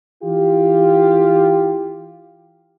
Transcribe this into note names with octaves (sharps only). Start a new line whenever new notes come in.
E3 F4 G4